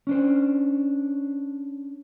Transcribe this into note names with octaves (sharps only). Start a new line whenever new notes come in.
C#4 D4 C5